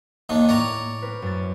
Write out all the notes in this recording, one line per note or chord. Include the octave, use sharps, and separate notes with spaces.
D#2 D#3 D4
A2 C#5 D5 A#5
C4 A#4 B4
F#2 A6